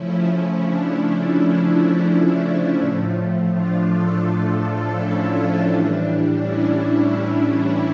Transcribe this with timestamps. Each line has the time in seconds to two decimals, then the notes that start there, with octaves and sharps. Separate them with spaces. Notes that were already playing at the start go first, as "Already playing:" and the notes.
Already playing: C#3 F3 A3 C#4 E4
0.27 C#4
0.63 D4
0.99 D4
1.35 C#4 E4
2.79 A2 F3 A3
3.51 D4 F4
3.87 F4 A4
4.23 D4 F4
4.95 C#4 E4
5.67 A2 E3 G3 D4
6.39 C#4 E4